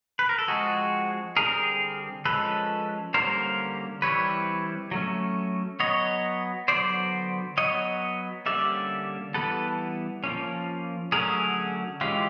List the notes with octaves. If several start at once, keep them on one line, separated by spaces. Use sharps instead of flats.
B4
A#4
A4
F3 G#3 C4 F#4 G#4
D3 G3 C4 G#4 A#4
F3 G#3 C#4 A4 B4
D3 G3 A#3 C#4 A#4 C5
E3 G3 C4 B4 C#5
F#3 A3 C#4
F#3 B3 C#5 D#5
D3 F#3 B3 C5 D5
F#3 B3 C#5 D#5
D3 G3 A#3 C#4 D5 E5
E3 G3 B3 A4 B4
F3 A#3 C#4
D3 F#3 A3 C#4 G#4 A#4
E3 G#3 C#4 F4 G4